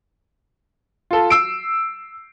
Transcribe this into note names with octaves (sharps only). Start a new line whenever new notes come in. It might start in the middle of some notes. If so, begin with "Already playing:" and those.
F4 A4
E6 C7 D7